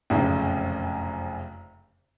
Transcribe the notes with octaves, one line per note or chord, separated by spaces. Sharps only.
F1 A#1 F#2 C#3